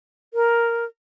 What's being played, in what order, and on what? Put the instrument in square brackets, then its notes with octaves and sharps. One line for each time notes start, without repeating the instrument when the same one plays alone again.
[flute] A#4